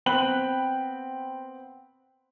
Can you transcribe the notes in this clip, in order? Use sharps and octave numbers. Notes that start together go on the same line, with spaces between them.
B3 C4 G5 B5 F#6 F#7